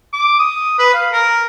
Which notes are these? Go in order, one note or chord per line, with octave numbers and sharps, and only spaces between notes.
D6
D#6
B4
F5
A#4